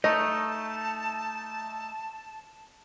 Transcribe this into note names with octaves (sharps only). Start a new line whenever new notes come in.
A3 D#4 D#5 A5